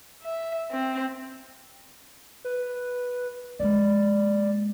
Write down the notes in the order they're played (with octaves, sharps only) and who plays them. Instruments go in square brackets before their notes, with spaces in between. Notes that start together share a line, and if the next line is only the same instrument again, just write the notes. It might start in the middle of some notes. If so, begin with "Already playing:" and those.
[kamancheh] E5
C4
[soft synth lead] B4
[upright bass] G#3 A#3 [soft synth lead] D5